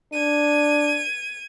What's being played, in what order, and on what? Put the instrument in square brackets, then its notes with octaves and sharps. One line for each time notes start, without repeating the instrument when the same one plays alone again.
[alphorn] D4 [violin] G#6 D#7